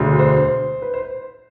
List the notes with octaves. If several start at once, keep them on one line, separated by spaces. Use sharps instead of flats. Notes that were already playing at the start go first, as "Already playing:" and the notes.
Already playing: E1 D2 D3
C5
B4
C5